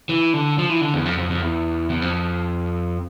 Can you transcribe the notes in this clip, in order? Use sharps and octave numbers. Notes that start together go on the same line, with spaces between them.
E3
D3
F3
E3
D3
E2
F2
F2
F2
E2
E2
F2